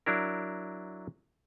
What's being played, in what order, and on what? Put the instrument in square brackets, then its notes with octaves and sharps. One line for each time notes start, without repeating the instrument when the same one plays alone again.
[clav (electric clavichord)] F#3 D4 E4 A#4